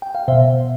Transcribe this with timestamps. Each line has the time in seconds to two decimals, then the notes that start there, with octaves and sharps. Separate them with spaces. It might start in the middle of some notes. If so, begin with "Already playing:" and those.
0.02 G5
0.15 F5
0.28 B2 C5 E5